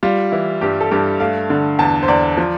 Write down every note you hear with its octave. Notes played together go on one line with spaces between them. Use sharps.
G3 F4
E3 E4
G2 G4
A4
G2 G4
A3 F5
D3
E2 A5
C5
E2 D5
F3